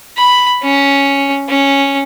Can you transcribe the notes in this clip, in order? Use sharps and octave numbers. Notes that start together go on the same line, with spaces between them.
B5
C#4
C#4